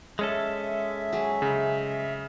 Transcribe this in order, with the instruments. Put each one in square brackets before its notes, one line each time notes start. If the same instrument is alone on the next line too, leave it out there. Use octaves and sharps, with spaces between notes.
[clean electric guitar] G#3 C#4 A4 [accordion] E5
[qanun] F#3 G#4
[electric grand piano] C#3